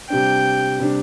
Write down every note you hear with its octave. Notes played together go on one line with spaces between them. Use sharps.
C3 G3 D4 G5
C3 G3 D4